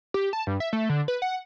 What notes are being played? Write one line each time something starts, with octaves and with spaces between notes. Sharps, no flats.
G4
A5
G2
E5
A3
D3
B4
F#5